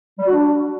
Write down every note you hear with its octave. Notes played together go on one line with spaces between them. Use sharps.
G3
F#4
D4